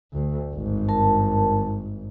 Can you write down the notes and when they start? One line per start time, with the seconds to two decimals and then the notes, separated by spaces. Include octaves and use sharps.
0.12 D2
0.52 G#1 G2
0.89 A#4 A5